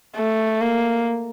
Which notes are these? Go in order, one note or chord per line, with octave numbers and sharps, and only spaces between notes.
A3
A#3